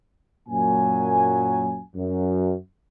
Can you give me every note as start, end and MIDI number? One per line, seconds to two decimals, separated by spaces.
0.49 1.80 42
0.49 1.80 46
0.49 1.80 54
0.49 1.80 58
0.49 1.80 80
1.96 2.54 42